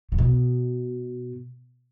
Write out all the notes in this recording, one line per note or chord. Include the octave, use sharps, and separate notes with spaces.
C#3
B2